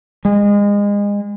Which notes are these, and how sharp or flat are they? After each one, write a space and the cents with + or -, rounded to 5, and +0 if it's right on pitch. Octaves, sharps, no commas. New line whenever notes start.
G#3 -30